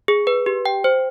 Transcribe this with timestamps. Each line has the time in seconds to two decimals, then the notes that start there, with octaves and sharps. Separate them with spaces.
0.08 G#4
0.27 B4
0.46 G4
0.66 G5
0.84 C5